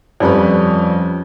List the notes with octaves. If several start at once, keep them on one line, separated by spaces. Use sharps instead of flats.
F2 G3 C#4 B4 B5